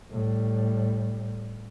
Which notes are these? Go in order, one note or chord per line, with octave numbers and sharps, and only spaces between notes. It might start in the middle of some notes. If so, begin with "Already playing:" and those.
A2 G3